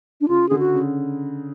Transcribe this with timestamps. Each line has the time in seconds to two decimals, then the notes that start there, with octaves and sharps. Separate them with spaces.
0.21 D4
0.28 C#3 F4
0.49 D3 G#4
0.59 F#4
0.74 C#3